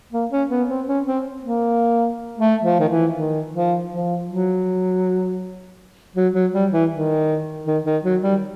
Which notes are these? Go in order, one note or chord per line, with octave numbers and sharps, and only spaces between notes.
A#3
C#4
B3
C4
C#4
C4
A#3
A3
F3
D#3
E3
D#3
F3
F3
F#3
F#3
F#3
G3
E3
D#3
D#3
D#3
F#3
G3